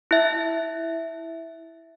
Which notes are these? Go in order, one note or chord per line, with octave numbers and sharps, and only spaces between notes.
E4 E5